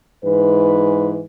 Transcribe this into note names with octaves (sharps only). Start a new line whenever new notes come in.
G#2 E3 B4